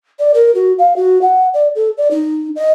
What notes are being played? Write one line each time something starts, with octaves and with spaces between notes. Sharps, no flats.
D5
A#4
F#4
F5
F#4
F#5
D5
A4
D5
D#4
D#5